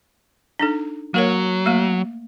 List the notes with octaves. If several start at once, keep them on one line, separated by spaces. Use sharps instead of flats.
D4 D#4 A4
F#3 A#3 A#4 C#5
A3 A#3